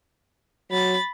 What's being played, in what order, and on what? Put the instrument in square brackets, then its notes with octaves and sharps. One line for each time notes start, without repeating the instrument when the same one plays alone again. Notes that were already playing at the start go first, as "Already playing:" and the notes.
[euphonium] F#3 [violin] B5 A6